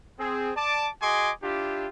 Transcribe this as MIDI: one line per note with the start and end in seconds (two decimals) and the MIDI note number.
0.19 0.51 60
0.19 0.51 68
0.56 0.89 74
0.56 0.89 81
0.56 0.89 86
1.02 1.31 66
1.02 1.31 68
1.02 1.31 75
1.02 1.31 80
1.02 1.31 84
1.02 1.31 86
1.43 1.88 62
1.43 1.88 64
1.43 1.88 65
1.43 1.88 67